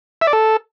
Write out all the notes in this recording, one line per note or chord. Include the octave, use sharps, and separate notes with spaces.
E5
D5
A4